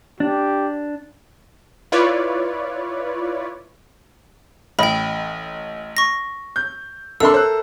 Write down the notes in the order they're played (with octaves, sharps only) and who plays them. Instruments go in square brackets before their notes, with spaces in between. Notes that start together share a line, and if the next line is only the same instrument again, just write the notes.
[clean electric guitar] D4 [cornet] G4
[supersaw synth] E4 F4 B4 C#5 D5
[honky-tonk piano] A1 D#5 [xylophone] G5 B5
[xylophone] C#6 A#6
[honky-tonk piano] G6
[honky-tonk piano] C2 D4 C6 [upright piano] A4 A#4 E5 [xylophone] E6
[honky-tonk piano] C5 F#6